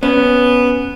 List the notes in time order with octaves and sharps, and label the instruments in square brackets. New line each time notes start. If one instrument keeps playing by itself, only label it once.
[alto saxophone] B3 [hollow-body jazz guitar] C#4